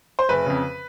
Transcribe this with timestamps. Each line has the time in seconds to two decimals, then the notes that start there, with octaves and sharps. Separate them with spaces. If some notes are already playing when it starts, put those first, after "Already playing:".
0.19 C5
0.29 F#1 B4
0.46 F2 C#3